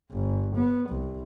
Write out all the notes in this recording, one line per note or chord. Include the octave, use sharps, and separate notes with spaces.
G1
B3
C2